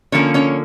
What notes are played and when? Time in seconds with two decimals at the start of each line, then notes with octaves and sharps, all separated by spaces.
0.12 D3 F3 A#3 C#4 C#5
0.34 C#4 C#5